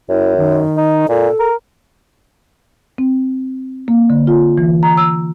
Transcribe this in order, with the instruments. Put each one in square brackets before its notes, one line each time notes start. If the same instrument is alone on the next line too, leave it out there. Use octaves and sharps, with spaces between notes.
[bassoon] F#2 [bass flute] E4
[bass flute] D#3
[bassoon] D#4
[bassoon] A#2 [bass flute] A4
[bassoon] A#4
[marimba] C4
A#3
D3
F4
E3
A#5
E6